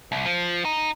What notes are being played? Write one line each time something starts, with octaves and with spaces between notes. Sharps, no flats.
C2
F3
D#4